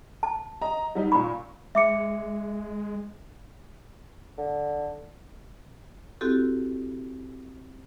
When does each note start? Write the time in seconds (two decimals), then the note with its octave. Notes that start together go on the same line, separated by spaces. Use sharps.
0.23 A5
0.61 D#5 A#5
0.95 F#3 G3 D#4
1.12 A#2 B5 C#6
1.75 G#3 E5 D6 C#7
4.38 D3
6.21 C4 E4 F#4 G4 A4